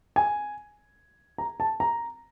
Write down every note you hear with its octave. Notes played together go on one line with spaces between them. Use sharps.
G#5
A#5
A5
A#5